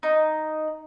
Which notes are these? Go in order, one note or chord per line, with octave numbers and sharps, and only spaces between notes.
D#4